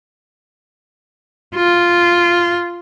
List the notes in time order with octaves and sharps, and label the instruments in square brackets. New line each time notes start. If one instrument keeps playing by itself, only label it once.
[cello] F4